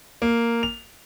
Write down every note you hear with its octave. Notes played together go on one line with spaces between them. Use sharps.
A#3
F7